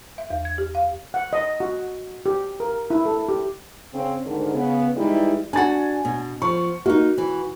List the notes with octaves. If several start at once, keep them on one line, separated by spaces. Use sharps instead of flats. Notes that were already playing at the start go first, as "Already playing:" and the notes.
E5
E2
G#6
G4
F5
F#5
D#5
F#4
G4
A#4
E4
A4
G4
C#3 C4 C#4
D2 G#2 D#3
C#3 B3
E3 G3 G#3 D#4 E4
D4 F#4 G#5 A6
B2
F3 C#6
A#3 D#4 F#4
E3